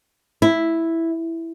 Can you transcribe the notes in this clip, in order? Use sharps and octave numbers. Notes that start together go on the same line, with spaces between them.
E4